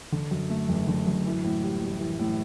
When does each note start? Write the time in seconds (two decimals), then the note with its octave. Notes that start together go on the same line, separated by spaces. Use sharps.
0.12 D3
0.31 F#2
0.50 A3
0.69 F#1
0.88 D3
1.07 F#2
1.26 E3
1.44 A2
1.63 G3
1.82 A1
2.00 E3
2.19 A2